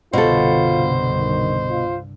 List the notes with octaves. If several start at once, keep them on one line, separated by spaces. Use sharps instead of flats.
C2 G2 B2 D3 F4 A4 C5
D#3
F4